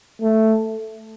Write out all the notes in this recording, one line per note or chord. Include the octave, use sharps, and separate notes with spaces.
A3